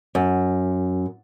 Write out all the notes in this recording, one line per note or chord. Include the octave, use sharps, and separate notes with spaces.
F#2